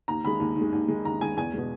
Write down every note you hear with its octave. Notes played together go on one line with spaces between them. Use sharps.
D#2 A#5
D#3 G#3 B5
D#2
D#3
G#3
D#2
D#3 G#3
D#2 A#5
D#3 G#3 G#5
E2 G#5
B2 G#3